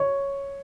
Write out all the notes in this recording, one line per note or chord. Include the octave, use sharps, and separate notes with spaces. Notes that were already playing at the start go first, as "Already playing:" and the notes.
Already playing: C#5